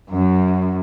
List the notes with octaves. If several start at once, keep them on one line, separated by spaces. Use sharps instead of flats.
F#2